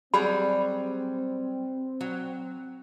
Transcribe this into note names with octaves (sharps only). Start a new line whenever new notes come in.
F#3 G3 C4 G#4 B5
F#3